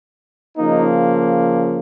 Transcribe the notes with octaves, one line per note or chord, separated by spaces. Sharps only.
C#3 F3 A#3 D#4